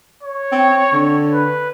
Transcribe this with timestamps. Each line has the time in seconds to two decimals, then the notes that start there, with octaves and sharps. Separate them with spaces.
0.23 C#5
0.52 C4
0.93 D3
1.33 B4